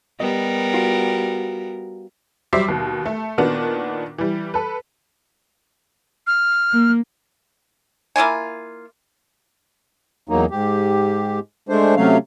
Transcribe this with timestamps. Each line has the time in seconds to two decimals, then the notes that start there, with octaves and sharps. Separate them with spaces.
0.20 G3 B3 A#4 D#5
0.74 F4 F#4
2.53 F#3 G3 C5 E5 D6 C7
2.68 D#2 B2
3.06 A3
3.38 A#2 D#3 B3 D4 F#4
4.18 E3 G3
4.54 A4 B4
6.27 F6
6.73 A#3
8.16 A#3 E4 F4 G#5
10.29 E2 F#3 A#3 D#4
10.51 G#2 G4
11.69 G#3 A3 D4 C5
11.96 C3 F#3 A3 C#4 F5